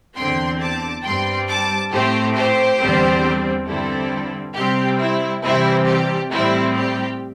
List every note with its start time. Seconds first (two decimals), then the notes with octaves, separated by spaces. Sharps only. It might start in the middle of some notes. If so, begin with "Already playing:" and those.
0.16 E2 D3 C4 G5 C6
0.60 A5 D6
1.04 G2 G3 C4 G5 C6
1.48 A5 D6
1.91 A2 A3 C4 G4 C5
2.36 G4 C5
2.79 E2 D3 G3 C4
3.67 G2 D3 G3 C4 E4 A4
4.55 C3 G3 C4 G4
4.99 E4
5.43 C3 E3 G3 C4 E4
5.87 G4
6.31 A2 G3 C4 E4
6.75 G4